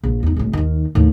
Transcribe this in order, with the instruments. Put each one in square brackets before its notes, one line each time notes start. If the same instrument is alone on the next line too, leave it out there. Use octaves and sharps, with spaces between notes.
[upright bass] A#1
E2 D#4
G#1 A2
D#2 D#3
D#2 A2